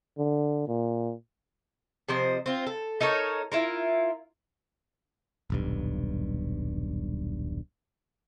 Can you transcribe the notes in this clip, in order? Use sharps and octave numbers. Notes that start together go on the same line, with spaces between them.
D3
A#2
C3 F3 C5 D#5
C4 F4
A4
D#4 A4 A#4 C#5
E4 F4 A#4
D#1 B1 G2